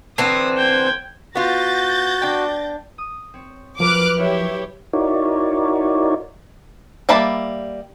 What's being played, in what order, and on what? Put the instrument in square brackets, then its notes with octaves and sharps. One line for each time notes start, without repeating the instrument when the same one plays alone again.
[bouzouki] D3 E3 C4 [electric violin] D#6
[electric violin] G5 G#6
[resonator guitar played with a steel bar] B3 F4 [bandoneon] F#4 [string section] G6 A6 A#6
[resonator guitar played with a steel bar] D4 G5
[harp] D#6
C4 C#5
[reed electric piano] E2 F3 A#4 [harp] F#3 B4 [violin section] D6 F6 F#6
[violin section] E4 G4 C#5 [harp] C#6 E6
[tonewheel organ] D#4 E4 F#4 A#4 C#5 D5
[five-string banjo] G3 A#3 E5 A5 B5